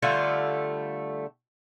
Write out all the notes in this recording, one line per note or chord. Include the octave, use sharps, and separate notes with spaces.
D3 G3 A3 F4